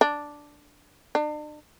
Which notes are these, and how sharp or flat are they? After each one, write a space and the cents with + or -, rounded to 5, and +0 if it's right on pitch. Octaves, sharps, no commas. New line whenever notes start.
D4 +0
D4 +40